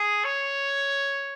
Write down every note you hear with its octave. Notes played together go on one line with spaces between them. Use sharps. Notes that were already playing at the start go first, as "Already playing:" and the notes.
Already playing: G#4
C#5